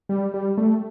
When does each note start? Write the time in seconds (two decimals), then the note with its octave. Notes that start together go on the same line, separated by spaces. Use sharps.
0.09 G3
0.34 G3
0.58 A3